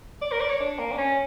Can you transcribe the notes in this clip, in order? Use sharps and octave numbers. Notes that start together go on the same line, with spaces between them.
D5
A#4
D5
C#5
D4
A#3
D4
C#4